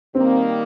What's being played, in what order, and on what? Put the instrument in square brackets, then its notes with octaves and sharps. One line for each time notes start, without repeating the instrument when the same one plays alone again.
[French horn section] D#3 G3 A#3 [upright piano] C4